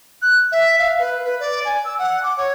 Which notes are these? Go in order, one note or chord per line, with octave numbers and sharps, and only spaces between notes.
F#6
E5
F5
B4
B4
D5
G#5
E6
F#5
D6
C#5